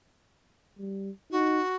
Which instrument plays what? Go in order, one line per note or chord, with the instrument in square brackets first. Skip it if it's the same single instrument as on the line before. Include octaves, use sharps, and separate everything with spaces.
[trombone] G3
[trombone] D#4 [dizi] F#4